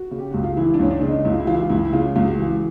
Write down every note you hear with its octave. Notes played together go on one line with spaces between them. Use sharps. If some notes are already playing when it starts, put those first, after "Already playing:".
Already playing: F#4
C#3
G4
C#2 F#4
F4
E3 E4
D4
C#2 C#4
D4
C#3 D4
D#4
C#2 E4
F4
E4
E3 F4
E4
F4
C#2 E4
E4
C#3 F4
C#2 F4
F#4
E3